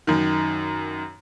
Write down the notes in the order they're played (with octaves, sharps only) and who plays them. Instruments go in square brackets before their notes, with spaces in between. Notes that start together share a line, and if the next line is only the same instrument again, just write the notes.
[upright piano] F#2 D#3